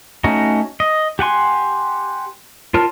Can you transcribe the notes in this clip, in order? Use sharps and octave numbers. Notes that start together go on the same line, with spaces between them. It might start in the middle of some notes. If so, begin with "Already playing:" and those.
A3 C#4 D#4 F#4
D#5
G4 F#5 G#5 C6
F4 A#4 C#5 A5 F6